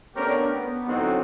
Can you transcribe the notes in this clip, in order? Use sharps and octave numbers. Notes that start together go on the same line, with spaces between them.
A3 B3 C#4 D4 G4 A#4
B3
A2 D3 F#3 C4 D#4 F#4